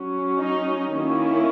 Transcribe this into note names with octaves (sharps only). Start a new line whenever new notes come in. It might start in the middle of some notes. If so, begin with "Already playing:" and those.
Already playing: F#3 C#4
D#4
D#3 A#3 C#4 E4